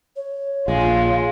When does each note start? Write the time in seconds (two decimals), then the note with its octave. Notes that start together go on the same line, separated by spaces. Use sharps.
0.16 C#5
0.68 A#1 G#3 F4